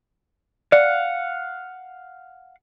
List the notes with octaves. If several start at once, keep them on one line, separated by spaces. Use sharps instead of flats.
D5 F5 F#5